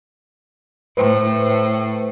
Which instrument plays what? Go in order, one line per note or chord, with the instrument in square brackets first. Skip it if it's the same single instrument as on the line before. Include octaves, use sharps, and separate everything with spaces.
[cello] A2 [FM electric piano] B4 C5 G5